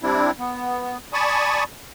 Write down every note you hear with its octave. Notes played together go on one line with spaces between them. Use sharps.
G3 C4 D4 E4
B3
D5 G#5 A5 B5 C#6 D#6